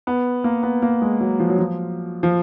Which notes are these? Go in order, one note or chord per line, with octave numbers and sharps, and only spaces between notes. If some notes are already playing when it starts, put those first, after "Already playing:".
B3
A#3
B3
A#3
G#3
F#3
F3
F#3
F3
F3